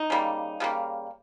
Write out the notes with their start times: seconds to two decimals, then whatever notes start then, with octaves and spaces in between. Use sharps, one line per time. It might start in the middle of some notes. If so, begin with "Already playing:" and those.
Already playing: D#4
0.10 C#3 G3 A#3
0.60 C#3 G3 A#3